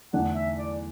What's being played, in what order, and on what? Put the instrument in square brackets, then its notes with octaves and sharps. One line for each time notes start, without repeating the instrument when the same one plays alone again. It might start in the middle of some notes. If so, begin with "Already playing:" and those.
[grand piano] E2 D3 A3 D4 [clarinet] F#5
[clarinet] E5
D5